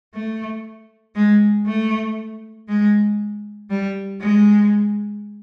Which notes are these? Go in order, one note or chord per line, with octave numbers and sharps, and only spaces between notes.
A3
G#3
A3
G#3
G3
G#3